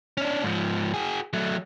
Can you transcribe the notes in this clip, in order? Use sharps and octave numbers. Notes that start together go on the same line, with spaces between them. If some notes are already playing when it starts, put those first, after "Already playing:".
C#4 D4
G#2 F3
F#4 G#4
F#3 A3